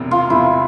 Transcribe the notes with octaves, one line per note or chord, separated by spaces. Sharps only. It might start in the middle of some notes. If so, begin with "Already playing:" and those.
Already playing: E1 E2 C3
F4
E1 E2 C3 E4